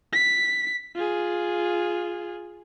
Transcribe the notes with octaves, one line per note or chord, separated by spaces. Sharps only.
B6
F4 G#4